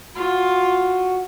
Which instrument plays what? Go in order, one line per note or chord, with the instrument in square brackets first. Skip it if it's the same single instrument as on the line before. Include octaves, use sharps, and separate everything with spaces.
[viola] F4 [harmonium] F#4